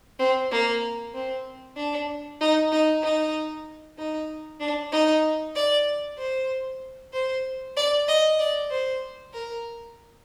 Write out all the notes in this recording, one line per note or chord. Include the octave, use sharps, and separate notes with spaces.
C4
A#3
C4
D4
D#4
D#4
D#4
D#4
D4
D#4
D5
C5
C5
D5
D#5
D5
C5
A#4